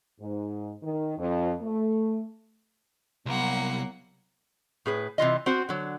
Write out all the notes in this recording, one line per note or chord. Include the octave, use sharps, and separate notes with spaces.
G#2
D#3
F2
A3
C2 F#3 A#3 B3 F#5
A2 G#4 B4
C3 E3 F4 D#5
C4 F#4 C5
D3 F#3